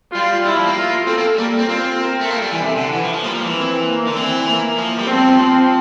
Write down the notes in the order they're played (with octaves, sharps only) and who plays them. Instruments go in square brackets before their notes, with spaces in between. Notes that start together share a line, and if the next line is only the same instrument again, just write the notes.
[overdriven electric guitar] G3 [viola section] F4
[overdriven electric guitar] G3 [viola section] E4
[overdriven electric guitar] F3
A#3
[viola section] F4
[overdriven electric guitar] C4 [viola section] A4
[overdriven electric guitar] A#3
[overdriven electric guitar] G3 [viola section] A#3
[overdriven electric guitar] C4
[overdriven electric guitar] C4 [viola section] F4
[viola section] A#4
[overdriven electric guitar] A3
[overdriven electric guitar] A#3 [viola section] A4
[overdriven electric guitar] G3
E3
C3
D3
E3
F3
F3
[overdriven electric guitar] G3 [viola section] A#3
[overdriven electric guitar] F3
E3
[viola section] C4
A#3
[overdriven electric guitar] D3
[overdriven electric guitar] E3 [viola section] C4
[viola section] A#3
[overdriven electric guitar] F3
G3
[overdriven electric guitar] F3 [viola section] C4
[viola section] C4